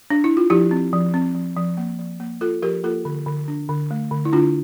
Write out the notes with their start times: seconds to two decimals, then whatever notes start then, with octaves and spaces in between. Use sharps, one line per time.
0.10 D4
0.24 E4
0.37 F4
0.50 F3 E4 G4
0.71 C4
0.93 F3
1.14 C4
1.35 F3
1.57 F3
1.77 A#3
1.99 F3
2.20 A#3
2.41 A#3 F4 A4
2.63 F3 G4 A#4
2.84 A#3 F4 A4
3.05 D3
3.26 D3
3.48 D4
3.69 D3
3.91 A3
4.11 D3
4.25 E4
4.33 D3 D4 F4